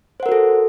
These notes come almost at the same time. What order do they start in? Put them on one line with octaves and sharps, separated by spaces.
C5 F#5 A#4 F#4 A4